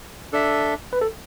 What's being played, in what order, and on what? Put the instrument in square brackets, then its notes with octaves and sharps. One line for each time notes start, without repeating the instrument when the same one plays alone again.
[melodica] D4 A4 E5
[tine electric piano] B4
A4